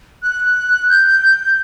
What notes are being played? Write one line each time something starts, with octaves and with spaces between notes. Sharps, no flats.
F#6
G6